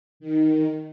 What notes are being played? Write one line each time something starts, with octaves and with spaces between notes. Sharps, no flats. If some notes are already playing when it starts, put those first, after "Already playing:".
D#3